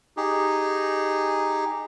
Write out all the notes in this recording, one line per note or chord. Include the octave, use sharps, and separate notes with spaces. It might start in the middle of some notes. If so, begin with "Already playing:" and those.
D#4 G4 G#4